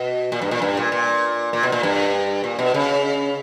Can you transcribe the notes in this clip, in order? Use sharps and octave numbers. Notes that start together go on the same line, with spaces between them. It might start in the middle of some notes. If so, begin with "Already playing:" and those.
Already playing: B2
A#2
G2
A#2
G2
A#2
A#2
A#2
B2
A#2
G2
A#2
B2
C#3